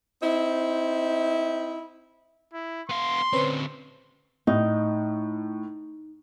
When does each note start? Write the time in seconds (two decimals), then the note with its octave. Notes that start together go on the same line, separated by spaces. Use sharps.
0.22 C4 D#4 E4
2.54 E4
2.89 B3 F5 C6
3.33 D3 C4 C#4 B4 C5
4.47 A2 D#4